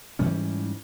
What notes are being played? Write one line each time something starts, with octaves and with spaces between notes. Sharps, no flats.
G#2 E3 G3 C#4